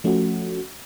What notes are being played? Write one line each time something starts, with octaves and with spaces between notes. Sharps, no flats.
F3 A3 C#4 F#4